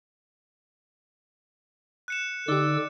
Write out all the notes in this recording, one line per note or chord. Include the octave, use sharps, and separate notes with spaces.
F#6 C#7 E7
D3 D#4 G4 D5 E6